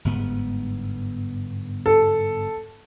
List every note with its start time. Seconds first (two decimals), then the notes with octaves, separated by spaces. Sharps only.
0.05 G1 G#2 B3
1.86 A4